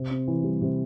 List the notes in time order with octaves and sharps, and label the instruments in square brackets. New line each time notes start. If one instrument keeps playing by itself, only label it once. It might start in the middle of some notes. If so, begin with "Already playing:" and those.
Already playing: [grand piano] C3
C4
E3
G3
C3